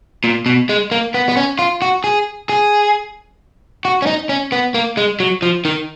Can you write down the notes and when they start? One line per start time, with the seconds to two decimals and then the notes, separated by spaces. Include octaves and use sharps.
0.24 A#2
0.46 B2
0.69 G#3
0.91 A#3
1.14 B3
1.29 B3
1.37 C#4
1.59 F4
1.82 F#4
2.04 G#4
2.49 G#4
3.85 F#4
4.02 C#4
4.07 D#4
4.29 C#4
4.52 B3
4.74 A#3
4.97 G#3
5.20 F#3
5.42 F3
5.65 D#3